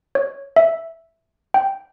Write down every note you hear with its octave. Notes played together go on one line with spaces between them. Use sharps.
C#5
E5
G5